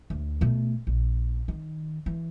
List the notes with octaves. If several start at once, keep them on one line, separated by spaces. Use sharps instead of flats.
D2
B2 A3
A#1
D#3
E3